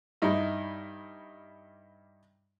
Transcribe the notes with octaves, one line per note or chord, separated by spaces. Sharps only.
G2 G3 D#4 E4